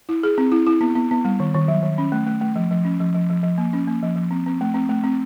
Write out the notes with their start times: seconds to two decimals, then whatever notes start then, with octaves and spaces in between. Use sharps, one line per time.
0.09 E4
0.23 G#4
0.38 C4
0.52 E4
0.67 E4
0.81 B3
0.95 B3
1.11 B3
1.25 G3
1.40 D#3
1.54 D#3
1.68 F#3
1.83 D#3
1.98 C#4
2.12 A3
2.27 A3
2.41 A3
2.56 F3
2.71 F3
2.85 C#4
3.00 F3
3.15 F3
3.30 F3
3.43 F3
3.58 A#3
3.73 C#4
3.87 A#3
4.03 F3
4.16 F3
4.31 C4
4.46 C4
4.61 A3
4.74 C4
4.89 A3
5.04 C4